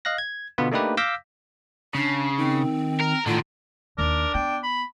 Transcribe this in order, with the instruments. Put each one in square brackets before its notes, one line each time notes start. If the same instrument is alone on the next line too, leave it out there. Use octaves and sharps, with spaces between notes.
[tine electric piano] D#5 F5 F#6 A#6
G#6
B2 D3 B3 F4
A3 A#3 D4 D#4 G4 B4
F5 D6 E6 G6 A#6 B6
[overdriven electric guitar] C#3 [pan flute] D4
[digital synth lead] C#6
[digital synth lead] D#3 [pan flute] C4
[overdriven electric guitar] A#4
[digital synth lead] A2 [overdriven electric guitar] D3 D#3 [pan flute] F4
[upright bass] D#2 [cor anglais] D4 [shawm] A#4
[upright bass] B3 [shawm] G5
[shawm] B5